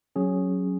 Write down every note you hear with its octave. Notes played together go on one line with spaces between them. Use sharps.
F#3 C#4 G#4